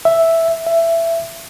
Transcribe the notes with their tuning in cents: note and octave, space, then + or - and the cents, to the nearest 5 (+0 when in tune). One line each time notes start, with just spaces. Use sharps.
E5 +0
E5 +15